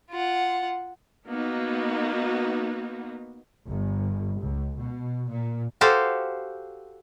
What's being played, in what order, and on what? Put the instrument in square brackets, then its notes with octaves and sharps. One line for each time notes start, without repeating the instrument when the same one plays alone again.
[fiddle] F4 F#5
[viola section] A#3 B3 D#4 F#4
[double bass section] G1
C#2
B2
A#2
[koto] F#4 G4 A4 C5 F5